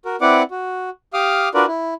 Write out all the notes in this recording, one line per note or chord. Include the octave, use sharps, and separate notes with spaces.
F#4 A#4
C4 E4 B4 D5 F#5 D6
F#4
G4 F5 D6 D#6 F6
D4 F4 F#4 A#4 B4 D5
E4